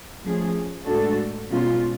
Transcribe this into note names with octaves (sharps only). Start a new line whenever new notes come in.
F3 A3 C#4 G#4
A2 G#3 D4 F#4 A4
B2 G#3 C#4 F4